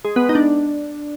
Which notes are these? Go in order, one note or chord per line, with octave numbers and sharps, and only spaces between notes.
G#3
B3
D#4
D4